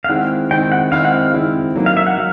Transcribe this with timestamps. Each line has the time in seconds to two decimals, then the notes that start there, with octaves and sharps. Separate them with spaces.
0.04 F5
0.08 D#3 G#3 C4 E4 F#5
0.51 D#3 G#3 C4 E4 G5
0.72 F#5
0.92 D#3 G#3 C4 E4 F5
1.05 F#5
1.13 F5
1.34 D#3 G#3 C4 E4
1.76 F#3 A#3 D#4
1.86 F5
1.97 E5
2.07 F#5
2.17 F#3 F5